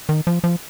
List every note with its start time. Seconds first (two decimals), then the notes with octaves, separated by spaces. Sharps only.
0.09 D#3
0.27 F3
0.44 F3